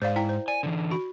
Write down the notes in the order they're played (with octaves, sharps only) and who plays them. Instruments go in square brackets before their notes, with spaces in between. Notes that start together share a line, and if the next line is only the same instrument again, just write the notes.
[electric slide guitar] G#2 [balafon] C5 D5 F5
[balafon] E4 G5
C5
[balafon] D5 [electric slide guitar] G#5
[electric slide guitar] D3 E3
[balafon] F#4 B5